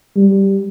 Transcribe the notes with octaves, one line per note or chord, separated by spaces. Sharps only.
G3